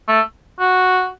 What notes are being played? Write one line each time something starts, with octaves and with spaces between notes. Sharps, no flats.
A3
F#4